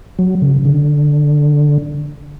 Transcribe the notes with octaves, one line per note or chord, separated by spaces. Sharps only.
F#3
C#3
D3